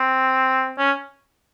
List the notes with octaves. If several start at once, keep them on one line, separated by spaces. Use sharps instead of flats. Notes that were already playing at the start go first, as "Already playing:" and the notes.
Already playing: C4
C#4